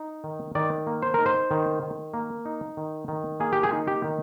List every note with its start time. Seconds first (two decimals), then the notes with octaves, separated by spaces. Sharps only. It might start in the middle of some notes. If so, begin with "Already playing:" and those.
Already playing: D#4
0.24 D#3
0.55 D#3 D5
0.87 A#3
1.02 C5
1.14 D#4 A#4
1.26 C5
1.51 D#3
1.83 D#3
2.14 A#3
2.45 D#4
2.77 D#3
3.08 D#3
3.40 A#3 G#4
3.53 G4
3.63 G#4
3.73 D#4
3.87 G4
4.04 D#3